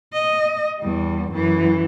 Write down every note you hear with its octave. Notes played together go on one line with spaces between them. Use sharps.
D#5
E2 G3
F#2 E3